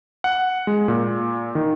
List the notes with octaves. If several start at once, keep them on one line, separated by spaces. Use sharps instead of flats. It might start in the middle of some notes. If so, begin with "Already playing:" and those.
F#5
G#3
A#2
D#3